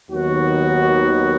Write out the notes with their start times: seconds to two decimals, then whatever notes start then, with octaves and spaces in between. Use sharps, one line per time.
0.10 D#2 D#3 F#3 B3 F#4